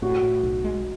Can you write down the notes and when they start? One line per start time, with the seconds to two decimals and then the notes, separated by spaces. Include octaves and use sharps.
0.02 A2 F#4
0.23 A2
0.43 B1
0.64 G#3